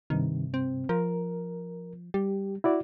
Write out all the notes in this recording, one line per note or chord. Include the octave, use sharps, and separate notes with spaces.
G2 C3 D#3
C4
F3 A#4
G3 G4
E4 F#4 D5